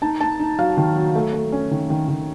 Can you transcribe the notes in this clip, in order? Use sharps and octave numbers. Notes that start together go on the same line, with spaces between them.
D#4 A5
D#4 A5
D#4
F#3 F5
D#3
F#3
A3
A3
C#4
D#3
D#3
D#3